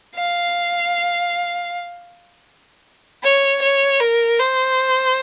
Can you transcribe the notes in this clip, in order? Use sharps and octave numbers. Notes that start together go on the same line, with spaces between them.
F5
C#5
C#5
A#4
C5